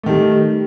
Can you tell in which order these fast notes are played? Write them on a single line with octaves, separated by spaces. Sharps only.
A3 D#3 G3